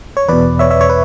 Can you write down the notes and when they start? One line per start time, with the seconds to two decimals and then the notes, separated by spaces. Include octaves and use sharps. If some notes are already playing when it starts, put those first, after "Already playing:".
0.17 C#5
0.28 E2 B2 B4 D5
0.59 C#5 E5
0.71 C#5 E5
0.81 C#5
0.89 B4